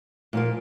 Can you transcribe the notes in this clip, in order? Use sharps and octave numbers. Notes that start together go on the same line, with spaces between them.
A#2 F3 A#3